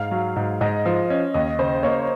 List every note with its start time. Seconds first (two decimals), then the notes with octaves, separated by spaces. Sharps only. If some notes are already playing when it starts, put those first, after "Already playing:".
Already playing: G#2 F5
0.11 F#3
0.36 G#2
0.61 G#2 D#5
0.86 F3
1.10 C#4
1.34 D#2 D#5
1.59 C#3 C5
1.83 A#3 C#5